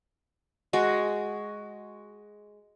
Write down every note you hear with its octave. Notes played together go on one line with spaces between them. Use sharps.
G#3 F#4